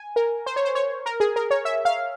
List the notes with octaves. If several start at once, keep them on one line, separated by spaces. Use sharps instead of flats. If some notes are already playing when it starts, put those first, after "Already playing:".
Already playing: G#5
A#4
C5
C#5
C5
C#5
A#4
G#4
A#4
C#5
E5
F5